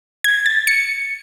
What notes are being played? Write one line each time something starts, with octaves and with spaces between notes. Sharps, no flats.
G#6
A6
C#7